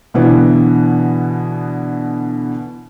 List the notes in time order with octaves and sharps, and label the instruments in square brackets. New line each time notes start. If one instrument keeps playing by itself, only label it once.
[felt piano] B2 D3 E3 B3